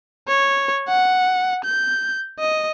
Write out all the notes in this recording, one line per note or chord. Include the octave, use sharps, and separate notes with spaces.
C#5
F#5
G6
D#5